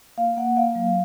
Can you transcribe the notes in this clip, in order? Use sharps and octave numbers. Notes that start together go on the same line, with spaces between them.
A#3 F5
A#3 F#5
A#3 F5
F#3